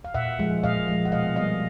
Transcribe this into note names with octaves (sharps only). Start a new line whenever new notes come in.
F5
A#2 E5 F#5
F3 G#3
A#2 D#5 F5
F3 G#3
F#5
B2 D#5 F5
G3 A#3 D#5 F5